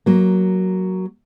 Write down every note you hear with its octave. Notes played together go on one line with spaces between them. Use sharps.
F#3 A#3